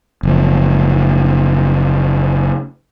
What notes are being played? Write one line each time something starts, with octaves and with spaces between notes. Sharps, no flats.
F#1 F3